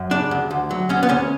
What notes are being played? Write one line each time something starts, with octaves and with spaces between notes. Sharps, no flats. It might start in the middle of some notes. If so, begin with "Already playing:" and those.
Already playing: F#2
C#3 D4
D2
D2
F#3
D2 C#4
B3
D2 C#4